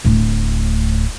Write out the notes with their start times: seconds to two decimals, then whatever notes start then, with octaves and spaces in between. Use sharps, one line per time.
0.05 D1 A2